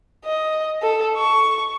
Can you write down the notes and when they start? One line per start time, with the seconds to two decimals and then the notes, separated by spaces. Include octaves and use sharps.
0.25 D#5
0.82 A4
1.17 C#6